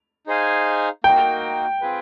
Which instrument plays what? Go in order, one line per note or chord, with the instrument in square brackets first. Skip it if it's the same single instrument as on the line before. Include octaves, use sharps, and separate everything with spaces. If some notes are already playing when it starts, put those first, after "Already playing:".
[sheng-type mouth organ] D#4 G#4 C5 F5 G#5
[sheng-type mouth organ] A#3 D#4 F#4 A#4 [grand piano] G5
[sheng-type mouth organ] C4 F4 G#4 B4